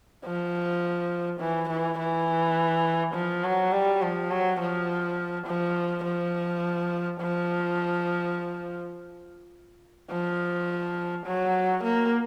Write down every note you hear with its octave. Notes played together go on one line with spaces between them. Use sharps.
F3
E3
E3
E3
F3
F#3
G3
F3
F#3
F3
F3
F3
F3
F3
F#3
A#3